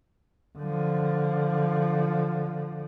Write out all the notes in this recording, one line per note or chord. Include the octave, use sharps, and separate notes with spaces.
D3 F3